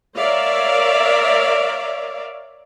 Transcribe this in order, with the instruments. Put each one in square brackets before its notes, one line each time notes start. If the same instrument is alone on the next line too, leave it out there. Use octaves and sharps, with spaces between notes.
[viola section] A#4 C#5 D5 E5 F5